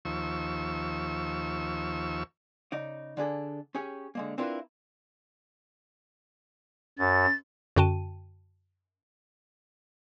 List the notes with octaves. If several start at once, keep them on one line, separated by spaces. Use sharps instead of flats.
D#2 F3 C#6 E6
C#3 D#4 D5
D3 D4 G#4 A4
C#4 G4 G#4 C#5
D3 G#3 A#3
C4 D4 E4 F4 A#4 B4
F#2 A6
F#2 D3 F#4 G5 A5 D#7